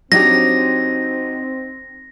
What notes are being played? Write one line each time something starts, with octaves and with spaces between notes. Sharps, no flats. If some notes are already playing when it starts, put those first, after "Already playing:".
F#3 C4 D4 D#4 G4 A#6